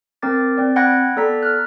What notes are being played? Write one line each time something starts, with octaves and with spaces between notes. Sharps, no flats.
C4 A#4 D6 A6
C4 D5
F#5 G5 B5 F#6 G#6 A#6
B3 A4 D5 A#5 B6
F6 F#6